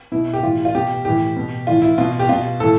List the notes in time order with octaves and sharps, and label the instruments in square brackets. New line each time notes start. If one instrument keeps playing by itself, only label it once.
[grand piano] B2 E4
G4
A2 E3 F4
F4
B2 G4
A2 E3 G4
B2
A2 E3 F4
E4
B2 F4
G4
B2 F4
A2 E3 A4